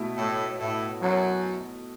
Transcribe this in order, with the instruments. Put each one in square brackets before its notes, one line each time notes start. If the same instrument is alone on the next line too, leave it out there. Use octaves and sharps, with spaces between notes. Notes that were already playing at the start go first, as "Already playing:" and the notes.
Already playing: [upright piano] B2 A3 E4
[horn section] A2
A2
F#2 F#3